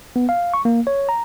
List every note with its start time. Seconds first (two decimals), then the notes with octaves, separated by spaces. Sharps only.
0.16 B3
0.29 F5
0.54 C#6
0.65 A#3
0.87 C#5
1.09 A#5